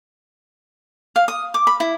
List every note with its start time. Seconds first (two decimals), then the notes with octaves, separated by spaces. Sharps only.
1.16 F5
1.28 D#6
1.54 D6
1.67 B5
1.80 E4